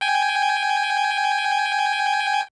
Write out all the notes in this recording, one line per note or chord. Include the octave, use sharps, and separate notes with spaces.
G5 G#5